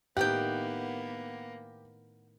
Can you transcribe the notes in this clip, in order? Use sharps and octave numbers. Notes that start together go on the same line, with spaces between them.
A2 D#3 A#3 B3 D#4 G4 F#5 G5